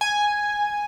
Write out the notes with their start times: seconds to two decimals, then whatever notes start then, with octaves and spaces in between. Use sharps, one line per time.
0.01 G#5